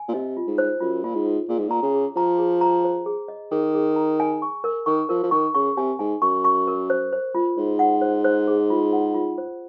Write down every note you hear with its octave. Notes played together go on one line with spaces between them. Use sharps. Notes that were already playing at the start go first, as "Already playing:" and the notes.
Already playing: G#5
A#2
C3 D#5
F4
G#2
C5
F#2 F4
A#2 F4
G#2
F4
A#2 G#4
G#2
A#2 A#5
C#3
G#4
F3 A#5
G#4
A#5
C5
G#4
D#5
D#3 G#4
G#4
A#5
G#5
C#6
A#4
D#3 C#6
F3 A#4
F3
D#3 C#6
C#3 C#6
C3 G#5
G#2 G#5
F#2 C#6
C#6
A#4
C5
C5
F4
G#2 C5
F#5
C5
C5
G#4
F4
F#5
F4
C5